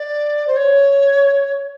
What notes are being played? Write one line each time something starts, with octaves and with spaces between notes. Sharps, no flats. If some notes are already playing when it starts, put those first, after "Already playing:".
Already playing: D5
C5
C#5